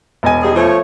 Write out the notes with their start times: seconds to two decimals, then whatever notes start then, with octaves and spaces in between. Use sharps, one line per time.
0.23 E1 D#5 G#5
0.43 G3 D#4 G#4
0.56 F3 A3 C#5